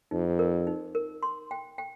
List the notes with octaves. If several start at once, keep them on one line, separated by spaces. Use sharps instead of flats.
F2 D#4
A#4
D#4
A#4
C6
G5
G5